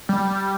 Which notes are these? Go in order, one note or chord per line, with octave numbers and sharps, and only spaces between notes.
G3